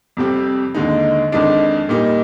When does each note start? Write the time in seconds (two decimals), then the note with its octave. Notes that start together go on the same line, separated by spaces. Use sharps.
0.17 F2 C3 G3 C4
0.75 D#2 D3 G#3 D#4
1.32 F2 D#3 G#3 D4
1.89 A#2 G3 A#3 D#4